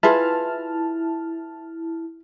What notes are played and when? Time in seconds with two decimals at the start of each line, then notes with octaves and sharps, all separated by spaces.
0.03 E4 F4 G#4 B4 A5 F6